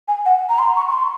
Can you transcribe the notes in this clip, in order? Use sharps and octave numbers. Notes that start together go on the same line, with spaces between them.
G#5
F#5
A#5
C6
C#6
C#6
C6